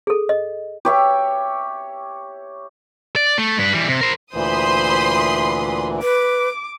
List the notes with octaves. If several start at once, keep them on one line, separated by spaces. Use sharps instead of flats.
G#4 A4
D#5
G4 C#5 E5
D5
A3
G2 B4
E3 G3
C3
A#4 C5
D2 A#2 E3 C5 B5 C6 D#6
B4 D6